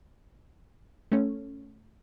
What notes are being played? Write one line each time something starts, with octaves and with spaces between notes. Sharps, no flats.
A3 C#4